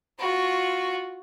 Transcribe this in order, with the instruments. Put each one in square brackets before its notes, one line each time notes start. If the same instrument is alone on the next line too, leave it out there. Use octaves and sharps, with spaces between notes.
[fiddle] F4 F#4